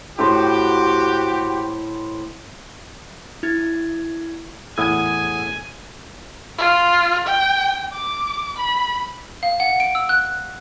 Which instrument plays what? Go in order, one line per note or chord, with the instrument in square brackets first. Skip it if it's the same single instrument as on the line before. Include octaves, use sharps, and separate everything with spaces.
[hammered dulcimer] A2 B4 C5 [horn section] F#4 G4
[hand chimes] E4 G#6
[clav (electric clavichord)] E2 A2 E4 [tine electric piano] F#5 D#6 E6 [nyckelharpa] G#5 [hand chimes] G#6
[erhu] F4
G5
D6
B5
[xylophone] F5
F#5
D7
E6
F#6